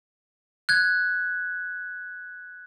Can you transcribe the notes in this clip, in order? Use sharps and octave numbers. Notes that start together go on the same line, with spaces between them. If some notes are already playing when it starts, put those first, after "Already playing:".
F#6 G#6